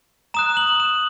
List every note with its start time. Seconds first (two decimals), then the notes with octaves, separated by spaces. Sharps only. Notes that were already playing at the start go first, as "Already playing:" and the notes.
0.34 A#5 D#6 F#6 E7
0.57 F#7
0.80 E7